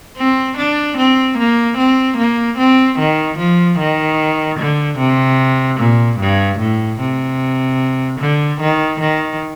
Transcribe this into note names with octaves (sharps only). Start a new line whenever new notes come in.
C4
D4
C4
A#3
C4
A#3
C4
D#3
F3
D#3
D3
C3
A#2
G2
A2
C3
D3
D#3
D#3